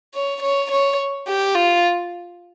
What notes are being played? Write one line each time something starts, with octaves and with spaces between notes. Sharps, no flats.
C#5
C#5
C#5
G4
F4